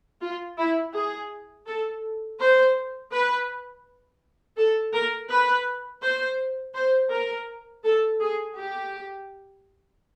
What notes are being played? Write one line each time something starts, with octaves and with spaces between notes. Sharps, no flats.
F4
E4
G#4
A4
C5
B4
A4
A#4
B4
C5
C5
A#4
A4
G#4
G4